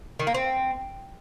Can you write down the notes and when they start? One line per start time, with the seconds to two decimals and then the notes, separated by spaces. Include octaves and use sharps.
0.19 D#3
0.27 A#3
0.34 C4